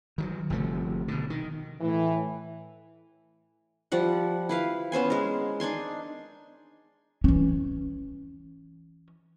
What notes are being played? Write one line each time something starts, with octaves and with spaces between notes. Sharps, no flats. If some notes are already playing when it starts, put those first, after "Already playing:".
D#3 E3 F#3
G1 C3 F3 A3
B2 D3
D#3
A2 E3
F3 G3 F#5
E4 B4 F5
B3 C#4 C5 G#5
G#3 A#4
D4 D#4 G#5 C6
E3 C#4